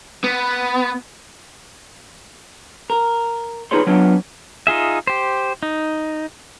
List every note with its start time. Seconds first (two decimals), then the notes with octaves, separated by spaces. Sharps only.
0.24 B3
2.90 A#4
3.71 D#4 F4 G#4 B4 C#5 C6
3.87 F#3 B3 D4 F4 C#5
4.67 D#4 F4 G#4 E5
5.07 G4 C5
5.63 D#4